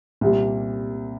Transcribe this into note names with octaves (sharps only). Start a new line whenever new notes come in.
C2 A#2 G3